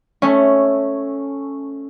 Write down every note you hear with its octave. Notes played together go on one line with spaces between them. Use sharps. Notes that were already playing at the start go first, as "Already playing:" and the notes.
A3 C#4